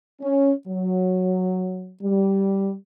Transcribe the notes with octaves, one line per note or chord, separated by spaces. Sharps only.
C#4
F#3
G3